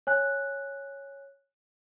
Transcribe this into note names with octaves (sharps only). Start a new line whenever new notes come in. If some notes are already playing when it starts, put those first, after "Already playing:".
C#5 G#5 F#6